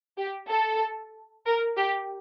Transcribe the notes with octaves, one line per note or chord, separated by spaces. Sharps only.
G4
A4
A#4
G4